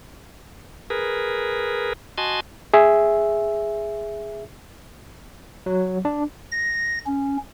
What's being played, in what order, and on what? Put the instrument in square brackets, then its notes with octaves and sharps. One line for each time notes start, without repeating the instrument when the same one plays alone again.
[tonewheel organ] G#4 A#4 B4
F#4 D#5 G#5 A5 C6
[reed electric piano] G#4 E5
[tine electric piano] F#3
D4
[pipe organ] A#6
C#4